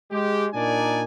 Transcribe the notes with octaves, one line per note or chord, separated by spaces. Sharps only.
G#3 G4
A#2 D4 D#4 A#4 D5 G#5